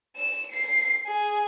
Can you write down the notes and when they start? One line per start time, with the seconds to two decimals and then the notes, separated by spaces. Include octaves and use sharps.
0.16 E7
0.51 C7
1.07 G#4